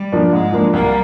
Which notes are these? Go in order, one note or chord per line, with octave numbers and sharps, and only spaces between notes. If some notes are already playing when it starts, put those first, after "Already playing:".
Already playing: G3
F3 A#3 D4
G#2 G#3
F3 A#3 D4
C2 G3 A#3